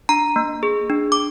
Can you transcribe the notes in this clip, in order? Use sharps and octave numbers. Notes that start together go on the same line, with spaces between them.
D4 A#5
A#3
G#4
D4
D6